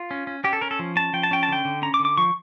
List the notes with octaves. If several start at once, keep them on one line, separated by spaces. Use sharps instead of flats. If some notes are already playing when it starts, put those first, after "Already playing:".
Already playing: F4
C#4
C#4
C#4 G4
A4
C#4 A#4
A4
F3
C#4 A5
F3 G5
A5
C#4 G5
A5
D3 G5
D3
C#4 A#5
D6
D3
D6
F3 C#6